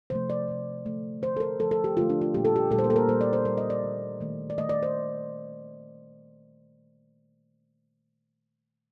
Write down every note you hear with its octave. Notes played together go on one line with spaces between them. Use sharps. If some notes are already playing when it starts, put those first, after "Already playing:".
C3 F3 A3 C5
D5
C3 F3 A3
D3 F3 A3
D3 F3 A3 C5
A4
A#4
D3 F3 A3 A4
A4
G4
D3 F3 A3 F4
D4
F4
A#2 G3 A#3 G4
A4
G4
A#2 G3 A#3 A4
C5
A#4
A4
A#4
A#2 G3 A#3 C5
D5
C5
A#2 G3 A#3 A#4
D#5
D5
D#3 A3
D#3 A3
D5
D#3 A3 D#5
D5
C5